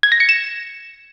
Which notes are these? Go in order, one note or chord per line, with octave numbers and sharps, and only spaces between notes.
G#6
A#6
C#7
E7